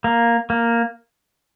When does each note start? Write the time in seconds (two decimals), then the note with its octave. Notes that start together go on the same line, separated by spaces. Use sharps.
0.04 A#3
0.50 A#3